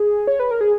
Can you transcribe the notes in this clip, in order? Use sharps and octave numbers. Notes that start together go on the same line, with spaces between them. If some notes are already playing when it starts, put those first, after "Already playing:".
Already playing: G#4
C#5
B4
A#4
G#4